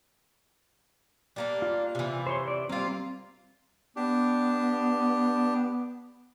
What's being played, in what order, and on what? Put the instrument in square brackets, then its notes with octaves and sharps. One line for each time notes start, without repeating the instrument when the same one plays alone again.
[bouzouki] G3 A#3 D4
[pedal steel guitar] F4
[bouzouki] C3 E3
[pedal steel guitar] C5 C#5 C6
D5
[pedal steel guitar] G3 C4 [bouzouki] A#3 F4
[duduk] B3 [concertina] D4 G4